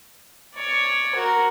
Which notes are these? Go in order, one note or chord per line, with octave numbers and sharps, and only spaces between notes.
C#5 D5
F#4 A#4